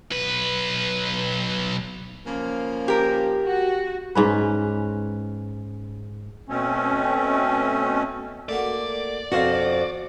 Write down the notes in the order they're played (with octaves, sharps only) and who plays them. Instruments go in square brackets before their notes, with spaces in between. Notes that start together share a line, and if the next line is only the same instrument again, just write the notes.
[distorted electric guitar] B1 B4
[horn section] C#3 F3 A#3
[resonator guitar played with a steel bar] G4 A#4
[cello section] F#4
[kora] G#2 C#4 B4
[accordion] B2 A3 C4 C#4
[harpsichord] A3 A#3 F#4 [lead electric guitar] D5
[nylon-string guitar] F2 C5 F5 [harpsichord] B2 D4 A4 [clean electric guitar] F#4